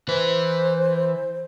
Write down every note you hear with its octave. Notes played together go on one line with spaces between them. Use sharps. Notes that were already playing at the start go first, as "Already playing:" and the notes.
E3 B4 C5